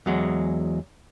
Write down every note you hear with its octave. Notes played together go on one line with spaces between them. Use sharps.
E2 F#3 G#3